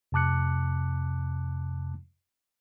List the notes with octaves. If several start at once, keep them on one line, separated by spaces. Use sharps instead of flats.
F2 C3 A5 D6 F#6 C#7